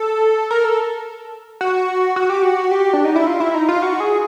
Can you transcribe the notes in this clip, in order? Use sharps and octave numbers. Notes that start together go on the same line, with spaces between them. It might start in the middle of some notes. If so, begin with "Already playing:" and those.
Already playing: A4
A#4
A4
F#4
F#4
G4
F#4
G4
D4
D#4
E4
F4
E4
D#4
F4
F#4
G#4